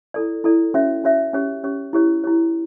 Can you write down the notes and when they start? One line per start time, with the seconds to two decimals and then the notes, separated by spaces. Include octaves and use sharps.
0.14 E4 A4 D5
0.44 E4 A4 D5
0.74 C#4 F#4 C#5 E5
1.04 C#4 F#4 C#5 E5
1.33 C#4 G4 C#5
1.64 C#4 G4 C#5
1.93 E4 G4 C#5
2.24 E4 G4 C#5